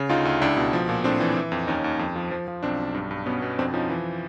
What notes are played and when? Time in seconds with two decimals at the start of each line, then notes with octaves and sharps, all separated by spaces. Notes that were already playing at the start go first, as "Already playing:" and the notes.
Already playing: C#3
0.09 D2 D#4 F4
0.25 D2
0.41 C#2 D4 E4
0.57 B2
0.73 F3
0.89 A#2
1.04 A2 C4 D4
1.20 E3
1.37 E3
1.52 F2
1.68 D#2 C#4 D#4
1.84 D#2
1.99 F2
2.16 F3
2.31 F3
2.48 F3
2.63 B1 C4 D4
2.79 B1
2.95 G2
3.11 G2
3.26 B2 B3 C#4
3.42 B2
3.59 F2 C4 D4
3.74 F3 C#4 D#4
3.90 E3